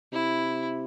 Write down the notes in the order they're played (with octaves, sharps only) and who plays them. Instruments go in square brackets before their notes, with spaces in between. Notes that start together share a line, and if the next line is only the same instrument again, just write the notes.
[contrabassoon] C3 [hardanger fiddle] E4